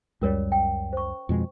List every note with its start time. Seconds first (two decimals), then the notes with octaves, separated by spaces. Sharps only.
0.21 C#2 F#2 G3 C#4 A#4 C#5
0.52 G5
0.93 C5 C#6
1.29 F2 B2 G#3